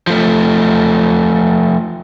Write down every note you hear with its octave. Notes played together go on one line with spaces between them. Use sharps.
F3 A3